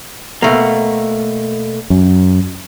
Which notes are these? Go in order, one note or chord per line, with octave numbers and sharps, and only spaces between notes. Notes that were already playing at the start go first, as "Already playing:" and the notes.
B2 A3 A#3
F#2